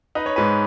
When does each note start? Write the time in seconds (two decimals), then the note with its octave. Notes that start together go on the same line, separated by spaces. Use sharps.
0.15 D#4 B4
0.26 C#5
0.36 G#2 B4